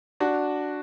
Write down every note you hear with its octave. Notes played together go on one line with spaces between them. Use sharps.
D4 F#4